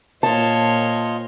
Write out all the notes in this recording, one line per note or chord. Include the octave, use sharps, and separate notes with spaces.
A#2 A#3 F4 C5 C#5 D#5 A5